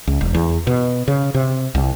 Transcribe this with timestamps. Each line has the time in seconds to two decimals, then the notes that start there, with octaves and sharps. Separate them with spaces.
0.07 C#2
0.21 E1
0.35 E2
0.67 B2
1.08 C#3
1.34 C3
1.75 C2